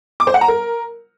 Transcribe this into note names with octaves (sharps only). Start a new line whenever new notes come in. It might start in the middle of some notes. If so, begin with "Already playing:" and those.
D6
C5
F#5
A#5
A#4